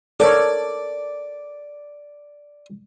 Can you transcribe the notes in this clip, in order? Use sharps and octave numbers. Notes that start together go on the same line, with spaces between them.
A4 A#4 C#5 D5